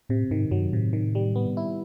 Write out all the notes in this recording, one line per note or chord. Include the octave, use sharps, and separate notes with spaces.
A2 C3
G#2 D#3
G2 F#3
A2 C3
D#3
G3
B3
E4